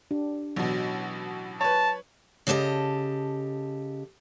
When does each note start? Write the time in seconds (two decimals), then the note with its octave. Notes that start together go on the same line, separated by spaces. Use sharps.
0.11 D4 G4
0.56 A1 B2 F#3
1.61 B4 C#5 A5
2.47 C#3 G4 A4 B4 D#5